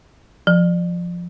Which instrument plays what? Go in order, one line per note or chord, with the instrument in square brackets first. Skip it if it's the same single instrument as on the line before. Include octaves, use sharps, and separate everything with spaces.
[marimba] F3